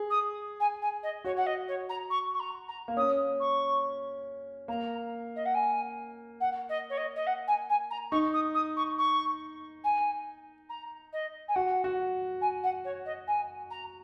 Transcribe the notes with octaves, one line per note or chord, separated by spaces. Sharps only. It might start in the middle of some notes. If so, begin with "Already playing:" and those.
Already playing: G#4
D#6
G#5
G#5
D#5
F#4 C#5
F#5
D#5
C#5
A#5
C#6
C#6
A#5
A#5
A#3
C#4 D#6
C#6
A#3 A#5
D#5
F#5
G#5
F#5
D#5
C#5
D#5
D#5
F#5
G#5
G#5
A#5
D#4 C#6
D#6
D#6
C#6
C#6
G#5
A#5
D#5
G#5
F#4 F#5
F#4
G#5
F#5
C#5
D#5
G#5
A#5